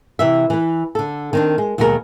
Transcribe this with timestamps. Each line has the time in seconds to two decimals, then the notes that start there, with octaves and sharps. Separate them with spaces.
0.19 C3 E3 E5
0.50 E3 B4
0.95 D3 A4
1.33 D#3 C4 D4
1.58 G#3
1.78 D#2 B2 F#3 G#3 F#4 A#4